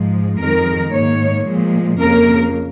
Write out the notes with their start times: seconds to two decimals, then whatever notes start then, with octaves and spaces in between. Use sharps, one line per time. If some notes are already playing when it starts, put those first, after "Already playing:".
Already playing: G#2 F3 G#3
0.40 F2 D#3 G#3 A#4
0.94 G#2 D#3 A#3 C#5
1.46 A#2 F3 G#3
2.00 F2 C#3 A#3 A#4